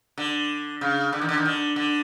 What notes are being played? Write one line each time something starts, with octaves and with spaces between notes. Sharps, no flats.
D3
C#3
D3
D#3
D3
D#3
D3
D3